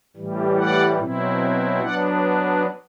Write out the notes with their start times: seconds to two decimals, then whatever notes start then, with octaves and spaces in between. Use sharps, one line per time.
0.16 A2 E3 G3
0.58 D5 F#5
0.99 B2 F#3 C4 E4
1.82 F#3 B3 D4 D5 F#5